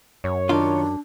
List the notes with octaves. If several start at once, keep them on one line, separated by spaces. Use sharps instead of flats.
F#2 C#5
D#3 D4 F4